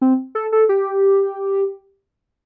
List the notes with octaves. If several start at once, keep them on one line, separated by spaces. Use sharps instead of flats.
C4
A4
A4
G4